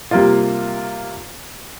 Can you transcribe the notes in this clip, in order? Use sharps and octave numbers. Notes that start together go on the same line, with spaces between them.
C3 G3 A#3 F4